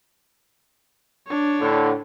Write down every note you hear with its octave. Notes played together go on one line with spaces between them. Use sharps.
D4 C#5
A2 D3